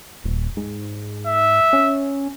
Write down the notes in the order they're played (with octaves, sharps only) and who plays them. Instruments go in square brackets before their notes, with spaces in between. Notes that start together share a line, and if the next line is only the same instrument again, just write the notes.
[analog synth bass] D#1
G#2
[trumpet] E5
[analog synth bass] C#4